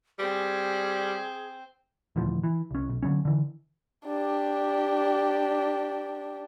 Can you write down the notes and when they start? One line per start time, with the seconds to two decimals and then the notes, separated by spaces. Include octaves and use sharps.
0.19 G3 C4 G#4
2.16 D#1 D2 E3 F3
2.44 E3
2.71 C2 C#4
2.89 B1
3.03 D3 D#3 F#3 C#4
3.25 D3 E3
4.06 D4 G4